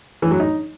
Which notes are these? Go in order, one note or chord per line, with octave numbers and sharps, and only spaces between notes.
E3
F#3
D#4